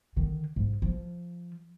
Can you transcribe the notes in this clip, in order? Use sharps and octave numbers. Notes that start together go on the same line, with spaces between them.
D3 D#3
G#2
F3